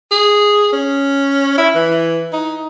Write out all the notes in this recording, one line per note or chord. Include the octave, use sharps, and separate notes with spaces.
G#4
C#4
E4
E3
D#4